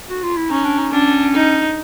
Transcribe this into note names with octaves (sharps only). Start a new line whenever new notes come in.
F#4
F4
E4
C#4 D#4
D4
D#4
C#4 D4
D#4